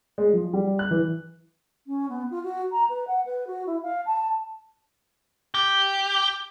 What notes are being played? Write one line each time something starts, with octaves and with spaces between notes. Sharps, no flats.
G#3
F3
G3
F#6
E3
C#4
B3
F4
F#4
A#5
B4
F#5
B4
F#4
E4
F5
A5
G4